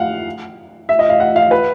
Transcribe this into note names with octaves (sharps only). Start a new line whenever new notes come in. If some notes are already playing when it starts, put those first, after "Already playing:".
Already playing: F5 F#5
E5
D#5
F5
F#5
F5
B4